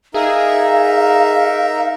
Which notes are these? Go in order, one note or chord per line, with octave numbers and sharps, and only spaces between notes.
D#4 G#4 A#4 E5 F5